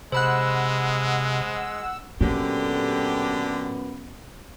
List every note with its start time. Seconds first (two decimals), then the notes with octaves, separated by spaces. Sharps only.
0.12 C3 G#3 C5 F#5 B5 E6 F#6
2.21 F#2 A#2 D3 B3 G4